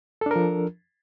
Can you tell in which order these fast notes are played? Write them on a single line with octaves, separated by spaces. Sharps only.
A4 D4 A#4 F3